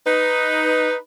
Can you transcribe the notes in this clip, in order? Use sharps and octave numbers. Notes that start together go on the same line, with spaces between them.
D#4 B4